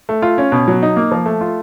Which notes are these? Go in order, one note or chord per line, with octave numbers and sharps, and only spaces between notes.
A3
F4
C#4
B2
F#3
D#4
A#3
F3
A3
F4